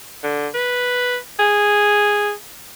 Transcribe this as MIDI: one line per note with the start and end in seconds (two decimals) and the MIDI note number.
0.23 0.48 50
0.54 1.17 71
1.39 2.31 68